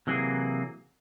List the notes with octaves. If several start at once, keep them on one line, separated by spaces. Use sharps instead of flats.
C3 E3 F#3 A#3 G#4